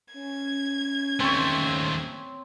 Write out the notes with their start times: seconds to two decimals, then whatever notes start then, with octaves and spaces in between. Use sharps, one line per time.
0.14 C#4 G#6
1.20 D#2 A3 C4 C#5